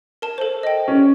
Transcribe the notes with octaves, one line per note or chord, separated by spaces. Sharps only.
A#4 A5
A4 C5
D#5 G5
C#4